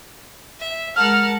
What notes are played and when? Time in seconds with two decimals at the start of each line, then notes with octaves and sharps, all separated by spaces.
0.59 E5
0.96 G#3 A#4 F#5 A5 F6